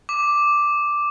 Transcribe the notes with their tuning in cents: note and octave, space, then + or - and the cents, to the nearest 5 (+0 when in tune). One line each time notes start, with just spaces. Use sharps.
D6 +0